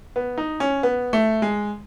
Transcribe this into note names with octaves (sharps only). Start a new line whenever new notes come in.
B3
D#4
C#4
B3
A3
G#3